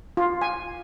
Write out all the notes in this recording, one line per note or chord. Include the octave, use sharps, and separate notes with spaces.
F4
G#5